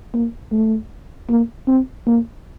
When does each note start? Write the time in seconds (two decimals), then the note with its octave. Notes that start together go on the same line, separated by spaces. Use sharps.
0.14 A#3
0.52 A3
1.29 A#3
1.67 C4
2.07 A#3